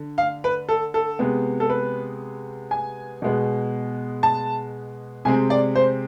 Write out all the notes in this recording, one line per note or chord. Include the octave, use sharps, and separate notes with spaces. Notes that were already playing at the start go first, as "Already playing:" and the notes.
Already playing: D3
F5
B4
A4
A4
C3 G#3 B3
A4
B4
G#5
B2 G#3 B3
A5
C3 G#3 C4 G#5
D5
C5